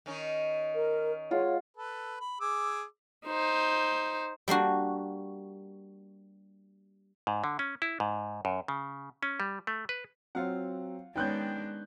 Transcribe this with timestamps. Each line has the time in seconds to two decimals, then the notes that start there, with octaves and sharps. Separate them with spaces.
0.06 D#3 C#4 D#4
0.74 A#4
1.31 G#3 F4 C#5 F#5
1.77 A4 B4
2.21 B5
2.41 G#4 D6 E6
3.27 D#4 C5
4.48 G3 A#3 D4 F#4
7.27 G#2
7.44 D3
7.59 C#4
7.82 E4
8.00 G#2
8.45 F#2
8.68 C#3
9.23 C#4
9.40 G3
9.67 A3
9.89 B4
10.35 F#3 C4 F4 F5 F#5
11.16 D#3 G#3 B3 C#4 D4 G5 F#6 G6